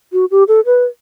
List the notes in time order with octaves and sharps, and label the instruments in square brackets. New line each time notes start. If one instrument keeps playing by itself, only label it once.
[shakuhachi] F#4
G4
A4
B4